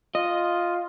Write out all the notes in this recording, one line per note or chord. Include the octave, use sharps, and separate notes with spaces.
F4 D#5